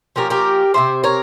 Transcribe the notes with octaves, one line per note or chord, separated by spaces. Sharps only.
F3 A#3 C#4 G4 A#4
G4 A#4
C3 G3 C4 C5 E5
A#4 C#5